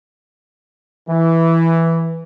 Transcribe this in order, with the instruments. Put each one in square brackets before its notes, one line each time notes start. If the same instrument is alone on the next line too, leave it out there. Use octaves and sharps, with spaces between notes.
[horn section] E3